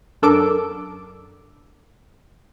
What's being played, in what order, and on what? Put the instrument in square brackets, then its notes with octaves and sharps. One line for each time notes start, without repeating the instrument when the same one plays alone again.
[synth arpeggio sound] F#2 D4 A4 A#4 D6 D7